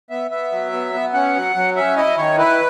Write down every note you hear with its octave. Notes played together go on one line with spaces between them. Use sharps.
B3 E5
B3 E5
F#3
B3
B3
C#4 F#5
F#3
F#3
C#4 E5
E4 D#5
D#3 C#5
E4 B4